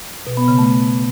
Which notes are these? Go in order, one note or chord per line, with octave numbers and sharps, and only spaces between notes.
B2
B3
C#3
A3